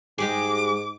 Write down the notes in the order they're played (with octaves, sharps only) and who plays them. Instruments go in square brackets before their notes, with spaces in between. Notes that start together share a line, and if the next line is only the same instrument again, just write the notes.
[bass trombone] G#2 [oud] G#3 G4 G#4 [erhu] D6